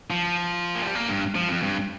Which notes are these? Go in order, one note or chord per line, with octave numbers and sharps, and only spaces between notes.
F3
A#3
G3
A#3
G2
F3
F2
G2